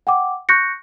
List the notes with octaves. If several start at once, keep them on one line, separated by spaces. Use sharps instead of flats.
F#5 G5 D6
C#6 F#6 G6 A#6 C#7